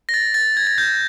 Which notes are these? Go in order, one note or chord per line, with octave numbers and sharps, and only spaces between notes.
A#6
A6
A6
G#6
G#6
G6